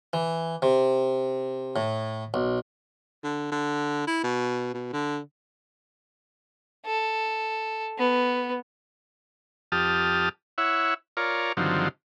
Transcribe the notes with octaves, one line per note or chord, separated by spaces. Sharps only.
E3
C3
A2
B1
D3
D3
E4
B2
B2
D3
A4
B3
F2 G4 A5 D#6 F6
E4 C#5 E5 F#5
F4 A#4 C#5 D5
G2 D3 D#3 F3 F#3 C4